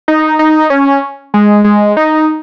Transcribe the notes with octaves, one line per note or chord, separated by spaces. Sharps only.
D#4
D#4
C#4
G#3
G#3
D#4